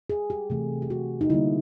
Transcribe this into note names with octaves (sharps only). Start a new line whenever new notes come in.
G#4
G4
C3 E3 A3
G4
F#4
D#4
D3 G3 A#3 E4